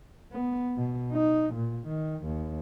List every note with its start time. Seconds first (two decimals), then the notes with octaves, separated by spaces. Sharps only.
0.32 B3
0.77 B2
1.12 D#4
1.54 A#2
1.88 D#3
2.25 D#2